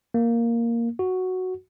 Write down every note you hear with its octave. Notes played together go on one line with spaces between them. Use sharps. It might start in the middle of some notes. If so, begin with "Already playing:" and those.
A#3
F#4